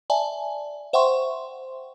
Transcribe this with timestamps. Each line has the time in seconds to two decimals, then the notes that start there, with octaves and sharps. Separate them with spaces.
0.10 D5 E5 G#5 A5
0.93 C5 E5 F#5 G5 C6 C#6